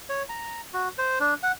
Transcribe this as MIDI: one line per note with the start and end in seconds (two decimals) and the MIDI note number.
0.09 0.23 73
0.29 0.61 82
0.74 0.88 66
0.98 1.19 72
1.20 1.34 62
1.43 1.52 78